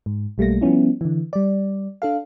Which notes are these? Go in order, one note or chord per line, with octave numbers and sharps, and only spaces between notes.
G#2
B1 G3 A3 A#3 A#6
F3 G3 B3 C#4 E4
D3 E3
G3 D5
D4 A4 F5